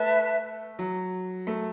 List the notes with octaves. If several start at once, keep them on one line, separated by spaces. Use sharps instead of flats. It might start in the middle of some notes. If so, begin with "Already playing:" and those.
Already playing: A3 B4 E5 A5
F#3
A3